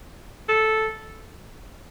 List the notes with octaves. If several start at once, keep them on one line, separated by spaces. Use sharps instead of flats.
A4